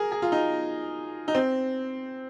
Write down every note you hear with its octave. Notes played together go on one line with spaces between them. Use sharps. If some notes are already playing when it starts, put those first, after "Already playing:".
Already playing: G#4 A#4
G#4
F4
D#4
D#4
C4